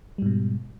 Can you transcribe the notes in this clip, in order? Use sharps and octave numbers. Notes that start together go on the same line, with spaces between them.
G#2 B2 G3